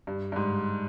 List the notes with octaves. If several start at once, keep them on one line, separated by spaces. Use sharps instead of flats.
G2
G2
G#2